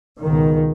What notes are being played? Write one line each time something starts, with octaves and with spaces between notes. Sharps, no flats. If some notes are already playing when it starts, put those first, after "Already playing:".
C#2 B2 D#3